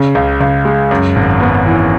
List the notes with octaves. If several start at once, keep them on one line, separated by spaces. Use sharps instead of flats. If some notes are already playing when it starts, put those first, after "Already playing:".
Already playing: C#3
C#2
C#2
G#3
F#2
G#1
B3
E3